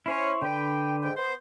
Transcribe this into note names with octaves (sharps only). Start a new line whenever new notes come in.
C#4 E4 C5 C#5
D3 B4 G5
G#2 G5
B3 C5